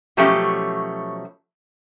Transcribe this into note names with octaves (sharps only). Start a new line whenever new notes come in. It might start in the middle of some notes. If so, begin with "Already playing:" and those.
B2 F3 F#3 A3 C#4 G4